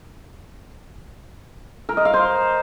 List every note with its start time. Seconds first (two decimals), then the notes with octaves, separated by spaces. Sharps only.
1.89 A#4
1.97 D#5
2.05 F5
2.14 C5